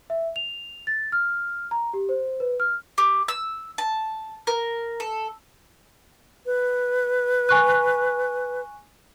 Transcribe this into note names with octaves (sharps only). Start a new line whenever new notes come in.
E5
F7
A6
F6
A#5
G4
C5
B4
F6
G4
E6
A5
A#4
A4
B4
G#5 C#6 F#6